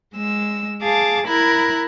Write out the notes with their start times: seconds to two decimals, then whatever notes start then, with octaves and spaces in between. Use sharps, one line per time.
0.15 G#3 E6
0.81 G#4 F5 A5 D6
1.28 E4 A#4 B5 F#6 G#6